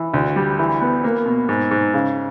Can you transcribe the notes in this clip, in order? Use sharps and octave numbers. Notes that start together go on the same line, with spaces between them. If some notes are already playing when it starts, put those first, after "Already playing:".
Already playing: E3
D2
G3
E3
B3
A#3
B2
G#2
G#2
C#3